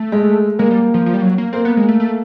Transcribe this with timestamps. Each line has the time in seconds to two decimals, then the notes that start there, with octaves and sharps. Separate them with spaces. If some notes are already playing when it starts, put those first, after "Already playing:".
Already playing: A3
0.12 G#3
0.59 G#3 A#3
0.70 G3
0.94 F3
1.06 F3
1.14 G3
1.22 F#3
1.38 A#3
1.53 A#3 C4
1.65 B3
1.77 G#3
1.89 A3
2.00 A3